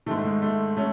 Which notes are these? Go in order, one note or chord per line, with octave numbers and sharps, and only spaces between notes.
G#2 D#3 A3
A3
G#3
A3
A3 C#4